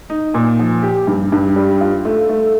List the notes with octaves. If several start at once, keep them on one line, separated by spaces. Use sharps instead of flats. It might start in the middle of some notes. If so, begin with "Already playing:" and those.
D#4
A#2
F3
G4
G2
G2
G3
F4
A3
A3